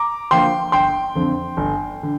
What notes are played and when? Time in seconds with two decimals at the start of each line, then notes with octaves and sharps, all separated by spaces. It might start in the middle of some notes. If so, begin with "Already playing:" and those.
Already playing: A#5 D6
0.31 D3 F3 A#3 G5 C6
0.72 G1 G5 C6
1.15 F2 D3
1.57 G1
2.03 D3